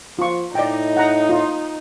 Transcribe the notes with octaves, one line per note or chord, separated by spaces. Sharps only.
F3 F4 C#6
A2 D#4 D5 D#5 G5
F#5 A#5
F4